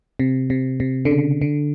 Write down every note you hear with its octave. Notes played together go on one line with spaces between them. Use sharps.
C3
C3
C3
D3
C#3
D3